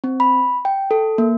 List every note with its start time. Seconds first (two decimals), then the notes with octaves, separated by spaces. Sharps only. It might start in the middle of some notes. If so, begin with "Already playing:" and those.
0.04 C4
0.20 B5
0.65 G5
0.91 A4
1.18 A#3